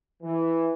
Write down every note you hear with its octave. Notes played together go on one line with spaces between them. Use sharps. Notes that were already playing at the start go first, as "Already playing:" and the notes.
E3